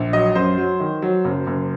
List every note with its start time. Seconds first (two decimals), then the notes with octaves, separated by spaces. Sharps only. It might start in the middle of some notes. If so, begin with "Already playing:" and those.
Already playing: A#1
0.13 F#3 D#5
0.35 F#2 C5
0.58 F#3
0.80 D#3
1.02 F#3
1.25 F#1
1.47 F#1